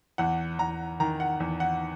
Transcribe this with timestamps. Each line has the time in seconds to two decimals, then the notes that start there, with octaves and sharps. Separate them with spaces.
0.18 E2 F#5
0.59 E2 A#5
1.00 D#3 A#5
1.20 F#5
1.40 E2
1.60 F#5